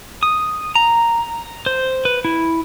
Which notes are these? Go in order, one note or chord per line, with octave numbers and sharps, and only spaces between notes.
D#6
A#5
C5
B4
E4